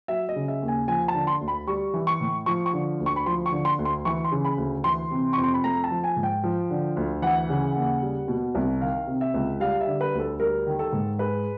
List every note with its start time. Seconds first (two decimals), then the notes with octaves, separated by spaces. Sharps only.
0.08 F#3 E5
0.29 D#5
0.36 C#3
0.48 E5
0.62 D#2
0.68 G#5
0.88 F3 G#5
1.08 A5
1.14 D3
1.27 C6
1.41 D2
1.48 B5
1.67 G3 C#6
1.94 E3
2.07 C#6
2.20 A2
2.46 F3 C#6
2.66 C#6
2.73 D3
3.00 D2
3.06 C#6
3.16 B5
3.26 F3 C6
3.46 C#6
3.52 D3
3.65 C6
3.79 D2
3.85 C6
4.05 E3 C#6
4.24 C6
4.32 C#3
4.44 B5
4.58 D2
4.84 E3 C6
5.11 C3
5.33 F2 C#6
5.44 C6
5.54 B5
5.64 A3 A#5
5.84 A5
5.91 F3
6.04 G#5
6.16 G#2
6.23 G5
6.44 F3
6.70 D3
6.97 D2
7.22 E3 F#5
7.49 C#3
7.75 D#2
8.02 G3
8.28 B2
8.55 C2
8.81 D#3 F5
9.07 C3
9.21 E5
9.34 C#2
9.60 G3 F5
9.81 E5
9.87 D3
10.01 B4
10.14 D2
10.19 A4
10.39 G3 A#4
10.67 D#3
10.79 A4
10.92 G#2
11.19 G#3 B4